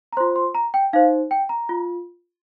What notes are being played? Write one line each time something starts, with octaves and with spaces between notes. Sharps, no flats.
A#5
F4 C5 C6
C6
A#5
G5
D#4 C5 F5
G5
A#5
F4